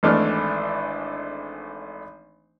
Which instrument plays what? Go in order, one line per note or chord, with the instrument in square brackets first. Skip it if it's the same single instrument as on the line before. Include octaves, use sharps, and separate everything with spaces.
[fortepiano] G#1 E3 A3 D4 F6